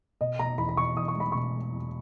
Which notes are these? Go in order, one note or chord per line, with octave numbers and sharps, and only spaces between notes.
B2 D#5
B2 A#5
E2 B5
B5
B2 C#6
E2 D#6
C#6
G#3
B5
B2 C#6
G#3
E2